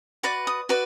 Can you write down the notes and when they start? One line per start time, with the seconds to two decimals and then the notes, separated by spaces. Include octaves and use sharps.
0.23 F#4 B4 D5 D6
0.47 D#6
0.69 F#4 B4 D5